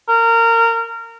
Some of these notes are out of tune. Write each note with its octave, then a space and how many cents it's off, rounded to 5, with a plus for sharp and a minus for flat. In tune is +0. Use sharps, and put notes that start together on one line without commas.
A#4 -20